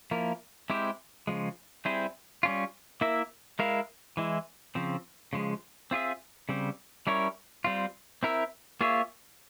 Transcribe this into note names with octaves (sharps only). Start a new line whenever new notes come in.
F3 A#3 E4 A#4
G#3 C4 E4 G4 C5
C#3 F3 G#3
G3 C4 E4 G#4 C5
G3 C#4 F4
A#3 E4 A#4 E5
G#3 E4 A#4 F5
E3 G#3 E4
C#3 F3 C4
C#3 F3 G#3
C4 F4 G#4 E5
C#3 G3 C4
G3 C#4 E4 A#4 C#5
G3 C4 F4
C4 E4 A#4 E5
A#3 F4 G#4 C#5 E5